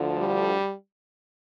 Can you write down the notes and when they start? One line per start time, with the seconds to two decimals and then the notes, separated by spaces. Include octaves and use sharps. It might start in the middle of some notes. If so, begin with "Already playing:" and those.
Already playing: D2 D3 F3
0.16 G3